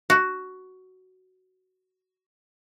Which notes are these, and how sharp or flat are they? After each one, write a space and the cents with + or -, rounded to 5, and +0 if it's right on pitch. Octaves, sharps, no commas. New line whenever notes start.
F#4 +10